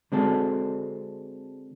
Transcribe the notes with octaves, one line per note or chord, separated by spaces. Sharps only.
D3 G#3 C4 F#4 A4